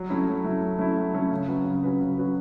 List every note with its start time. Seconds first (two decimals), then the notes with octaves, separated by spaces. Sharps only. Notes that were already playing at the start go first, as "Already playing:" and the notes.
Already playing: F#3
0.09 A3 C#4 E4
0.28 F#3
0.44 A3 C#4 E4
0.61 F#3
0.79 A3 C#4 E4
0.97 F#3
1.14 A3 C#4 E4
1.30 C#3
1.48 F#3 C#4 F#4 B4
1.65 C#3
1.83 F#3 C#4 F#4 B4
2.01 C#3
2.18 F#3 C#4 F#4 B4